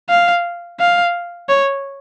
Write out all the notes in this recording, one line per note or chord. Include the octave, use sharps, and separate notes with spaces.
F5
F5
C#5